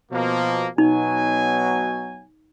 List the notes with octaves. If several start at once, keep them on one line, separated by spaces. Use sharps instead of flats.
B2 F3 A#3
B2 F#3 D#4 G#5